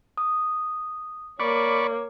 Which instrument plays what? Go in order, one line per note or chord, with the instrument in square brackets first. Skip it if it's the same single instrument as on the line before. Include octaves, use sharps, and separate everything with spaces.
[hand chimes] D#6
[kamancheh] A#3 C#5 [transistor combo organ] D5 B5 C#6 [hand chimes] D6